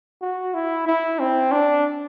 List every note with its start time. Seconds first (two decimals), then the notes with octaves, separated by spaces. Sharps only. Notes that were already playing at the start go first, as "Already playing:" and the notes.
0.21 F#4
0.54 E4
0.87 E4
1.19 C4
1.52 D4